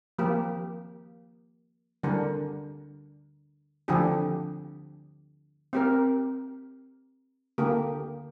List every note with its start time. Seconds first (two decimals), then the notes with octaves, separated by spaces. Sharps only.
0.19 F3 A#3 G4
2.03 D3 G3 D4 A#4
3.88 D3 F3 D4 G4
5.73 C4 G4 A#4
7.58 D3 A#3 G4